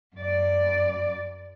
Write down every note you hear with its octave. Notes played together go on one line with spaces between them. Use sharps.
F#2 D5